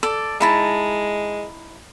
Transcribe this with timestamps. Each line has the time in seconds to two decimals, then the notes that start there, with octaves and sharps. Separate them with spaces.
0.03 A4 D5
0.41 G#3 D#4 E4 A5